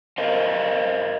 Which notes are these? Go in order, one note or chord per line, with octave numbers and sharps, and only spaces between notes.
A#4 C5 D#5 F5